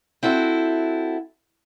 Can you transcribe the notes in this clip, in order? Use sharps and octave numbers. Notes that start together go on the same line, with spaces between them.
C4 E4 F#4 A4